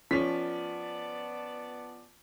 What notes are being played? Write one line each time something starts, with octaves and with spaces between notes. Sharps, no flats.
F3 B3 C#4 D5 A5 B6